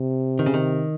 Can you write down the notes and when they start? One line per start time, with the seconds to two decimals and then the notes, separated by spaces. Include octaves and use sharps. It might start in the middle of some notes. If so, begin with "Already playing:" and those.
Already playing: C3
0.39 D#3
0.46 C#3
0.54 D#3